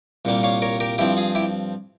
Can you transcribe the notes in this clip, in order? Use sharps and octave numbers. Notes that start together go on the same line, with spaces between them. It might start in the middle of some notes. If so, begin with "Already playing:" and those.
C2 A#2 G3 A#3
C#5 F5
A#4 C#5
G4 A#4
G2 F3 C4 E4 G4
F4 G#4
E4 G4